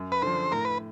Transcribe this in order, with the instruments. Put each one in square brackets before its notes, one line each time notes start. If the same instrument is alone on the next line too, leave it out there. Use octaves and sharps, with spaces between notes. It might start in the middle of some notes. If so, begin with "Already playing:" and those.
Already playing: [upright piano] F#2
[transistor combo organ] B4
[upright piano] D3 F3 [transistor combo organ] C5
[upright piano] A2 [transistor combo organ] A#4
[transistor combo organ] B4